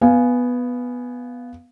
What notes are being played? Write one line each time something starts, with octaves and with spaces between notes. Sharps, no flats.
B3 F5 G#5